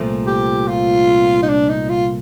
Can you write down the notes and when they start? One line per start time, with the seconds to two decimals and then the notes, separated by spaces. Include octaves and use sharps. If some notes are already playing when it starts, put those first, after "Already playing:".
Already playing: C2 A#2 F3 A3
0.27 G4
0.68 F4
1.43 D#4
1.48 D4
1.69 D#4
1.89 F4